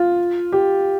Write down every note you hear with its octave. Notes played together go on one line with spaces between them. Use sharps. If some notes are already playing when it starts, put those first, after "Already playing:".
Already playing: F4
G4